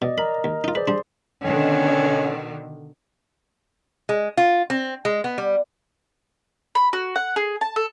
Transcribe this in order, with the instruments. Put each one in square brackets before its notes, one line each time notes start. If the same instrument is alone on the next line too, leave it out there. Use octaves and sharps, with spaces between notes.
[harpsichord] B2 [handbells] D5 D#5
[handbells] A#4 D#5 A#5 [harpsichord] B5
[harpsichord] D#2
D#4 F4
[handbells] G#4 C5 D5 [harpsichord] B4
[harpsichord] G3 D4 [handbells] C6
[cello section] B2 D3 D#3 [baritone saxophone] C#4
[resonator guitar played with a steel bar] G#3
F4
C4
G#3
B3
G3
[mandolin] B5
F#4
F#5
G#4
A5
A4